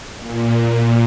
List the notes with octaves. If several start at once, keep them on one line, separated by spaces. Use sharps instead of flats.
A#2